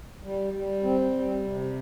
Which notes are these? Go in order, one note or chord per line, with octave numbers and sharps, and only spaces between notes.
G3
G3
C4
G3
C3